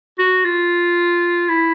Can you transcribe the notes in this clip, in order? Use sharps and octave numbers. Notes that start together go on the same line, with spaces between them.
F#4
F4
E4